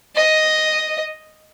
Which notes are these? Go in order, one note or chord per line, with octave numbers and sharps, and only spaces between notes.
D#5